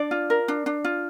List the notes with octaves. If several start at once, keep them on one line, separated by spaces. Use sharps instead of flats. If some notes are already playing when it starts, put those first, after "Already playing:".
Already playing: D4 D5
F4
A#4
D4
D4
F4